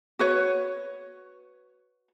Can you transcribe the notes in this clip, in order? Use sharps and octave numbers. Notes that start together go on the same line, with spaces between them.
F#4 B4 C#5